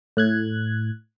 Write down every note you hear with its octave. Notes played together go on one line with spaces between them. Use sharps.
A2 F#6 G#6